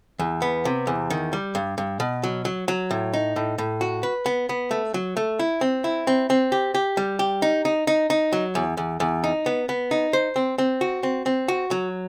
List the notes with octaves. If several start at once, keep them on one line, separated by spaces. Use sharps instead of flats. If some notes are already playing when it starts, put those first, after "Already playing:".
E2
B3
C3
E2
D#3
G3
G2
G2
B2
F#3
F#3
F#3
A2
D#4
A2
A2
F#4
B4
B3
B3
A3
F#3
A3
E4
C4
E4
C4
C4
G4
G4
G3
G4
D#4
D#4
D#4
D#4
F#3
E2
E2
E2
D#4
B3
B3
D#4
C5
C4
C4
F#4
C4
C4
F#4
F#3